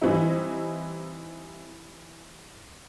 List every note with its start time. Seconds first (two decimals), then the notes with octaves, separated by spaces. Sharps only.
0.02 E3 G3 C4 D#4 E4